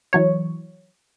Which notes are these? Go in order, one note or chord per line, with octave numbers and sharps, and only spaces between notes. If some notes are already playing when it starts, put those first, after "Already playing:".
E3 F#3 C#5